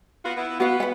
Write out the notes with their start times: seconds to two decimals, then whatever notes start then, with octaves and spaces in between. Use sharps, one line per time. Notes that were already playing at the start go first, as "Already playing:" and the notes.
0.24 B3 F4 F#4
0.37 B3 E4
0.60 B3 F#4 F5
0.80 B4 F#5